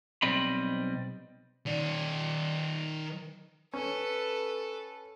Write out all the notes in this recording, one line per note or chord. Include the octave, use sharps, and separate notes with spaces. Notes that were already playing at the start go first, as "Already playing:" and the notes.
B1 G3 C4 D#5 B5
D#3 D5
C#4 A4 B4